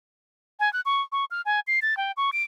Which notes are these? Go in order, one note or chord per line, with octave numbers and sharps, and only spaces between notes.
G#5
F#6
C#6
C#6
F6
G#5
C7
A6
G5
C#6
D7